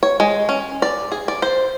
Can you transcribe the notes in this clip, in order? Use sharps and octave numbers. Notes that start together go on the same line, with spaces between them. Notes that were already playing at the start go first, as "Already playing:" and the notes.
C#5
G#3
C#4
D5
G#4
D5
C5